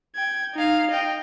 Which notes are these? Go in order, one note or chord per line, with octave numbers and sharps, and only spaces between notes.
G5 G#6
D#4 F5
D#5 G5